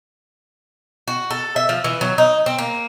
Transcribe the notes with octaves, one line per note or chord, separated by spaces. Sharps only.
F#4
A4
E5
F3
E3
F#3
D#4
C4
A#3